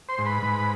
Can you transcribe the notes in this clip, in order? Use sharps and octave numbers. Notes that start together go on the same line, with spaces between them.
C5 C6
G#2
B4 B5
G#2